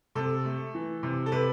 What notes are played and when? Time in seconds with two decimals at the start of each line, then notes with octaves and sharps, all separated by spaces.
0.15 C3 A4
0.45 A3
0.74 E3
1.03 C3
1.26 A4
1.32 C3 B4